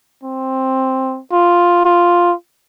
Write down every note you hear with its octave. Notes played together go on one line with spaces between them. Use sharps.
C4
F4
F4